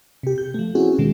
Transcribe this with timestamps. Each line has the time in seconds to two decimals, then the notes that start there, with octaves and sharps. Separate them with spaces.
0.23 C3 G4
0.38 G6
0.54 F3 A3
0.75 C4 C#4 E4 F#4 G#4
0.99 B2 D#3 G#3